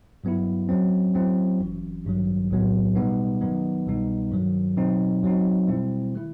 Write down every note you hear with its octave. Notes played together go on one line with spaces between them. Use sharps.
G2 F#3 B3 E4
F#2 F#3 C4
F#2 F#3 A3 C4 E4
G1 F#2 E3
A1 G2 D#3 F#3
B1 A2 F#3 B3
B2 G3 B3 D#4
F#2 D#3 F#3 B3 D#4
C2 B2 G3 B3 D#4
G2 D#3 F#3
B2 F#3 C4 D#4
F#2 F#3 C4 D#4
B2 G3 C4 E4
D#3 A3 E4